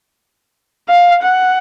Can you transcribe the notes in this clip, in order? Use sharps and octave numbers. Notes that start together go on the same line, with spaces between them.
F5
F#5